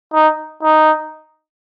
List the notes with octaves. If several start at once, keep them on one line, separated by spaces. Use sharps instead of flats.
D#4
D#4